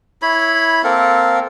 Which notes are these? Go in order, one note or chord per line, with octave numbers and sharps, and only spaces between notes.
E4 C#5 B5
A#3 C4 A4 A#4